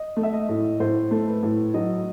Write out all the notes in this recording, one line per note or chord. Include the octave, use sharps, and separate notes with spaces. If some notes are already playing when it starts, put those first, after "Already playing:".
Already playing: D#5
A3
E5
D#5
A2
A2 C5
A3
B4
A2
F#3 D#5